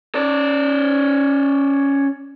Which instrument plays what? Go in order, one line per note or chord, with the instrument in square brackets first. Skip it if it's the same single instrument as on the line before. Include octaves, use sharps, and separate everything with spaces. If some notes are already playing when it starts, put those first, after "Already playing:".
[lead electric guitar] C#4 D5